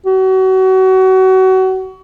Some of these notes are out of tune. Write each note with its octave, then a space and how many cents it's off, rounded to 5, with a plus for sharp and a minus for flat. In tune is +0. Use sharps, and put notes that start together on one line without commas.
F#4 +30